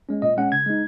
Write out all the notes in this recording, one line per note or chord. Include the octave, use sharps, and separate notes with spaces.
G#3 C#4
A#2 D#5
G#3 C#4 F#5
C#3 G#6
G#3 D#4